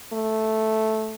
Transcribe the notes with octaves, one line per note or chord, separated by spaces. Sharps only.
A3